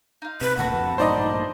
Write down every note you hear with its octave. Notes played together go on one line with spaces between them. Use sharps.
D#4 F4
C3 B4
D#1 D2 A#2 F#4 A4 F#5 B5
F2
A1 G2 A#2 D#4 C5 D5 D#5